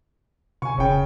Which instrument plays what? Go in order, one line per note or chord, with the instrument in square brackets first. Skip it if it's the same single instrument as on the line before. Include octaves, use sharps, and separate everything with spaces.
[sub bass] C3 [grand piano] G#5 C#6
[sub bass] F1 [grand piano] C#3 G5